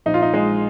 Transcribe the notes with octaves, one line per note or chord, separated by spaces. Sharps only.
A#1 D#4
F4
D#4
A#1 G#3